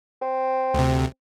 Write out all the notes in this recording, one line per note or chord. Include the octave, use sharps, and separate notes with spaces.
C4
D2 C3